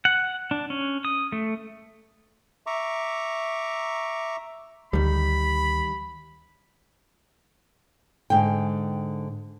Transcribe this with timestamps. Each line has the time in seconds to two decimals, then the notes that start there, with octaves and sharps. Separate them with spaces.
0.05 F#5
0.51 D4
0.70 C#4
1.05 D#6
1.32 A3
2.67 E5 A#5 C#6 D6
4.93 D2 D#3 G3 B5
8.30 G#2 D3 G5